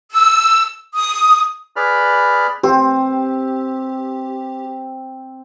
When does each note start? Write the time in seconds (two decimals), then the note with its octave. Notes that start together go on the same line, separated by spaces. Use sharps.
0.12 E6
0.94 D#6
1.76 G#4 B4 D5 B5 F6
2.63 C4 G4